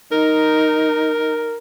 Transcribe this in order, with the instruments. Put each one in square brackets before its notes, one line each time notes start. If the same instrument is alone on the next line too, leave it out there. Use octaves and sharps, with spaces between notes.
[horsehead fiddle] D#4 [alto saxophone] A#4